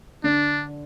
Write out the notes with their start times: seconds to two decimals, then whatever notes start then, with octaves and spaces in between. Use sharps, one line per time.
0.24 D3 D4